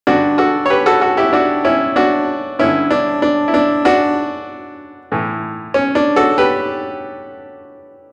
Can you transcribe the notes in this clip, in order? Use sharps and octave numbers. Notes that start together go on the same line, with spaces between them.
G2 D3 D4 F#4
F#4 A4
C#5
G4 B4
F#4 A4
F#4 A4
E4 G4
D4 F#4
C#4 E4
D4 F#4
G2 D3 C#4 E4
D4
D4
E4
D4
D4 F#4
A2 E3
C#4
D4
F#4 A4
G4 B4